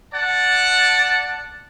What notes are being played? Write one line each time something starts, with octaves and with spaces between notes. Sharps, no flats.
D5 F#5 A5